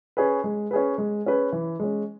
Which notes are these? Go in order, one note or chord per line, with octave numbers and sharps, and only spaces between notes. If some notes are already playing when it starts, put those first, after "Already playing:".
C#4 G#4 B4
G#3
C#4 G#4 B4
G#3
C#4 G#4 B4
E3
G#3 C#4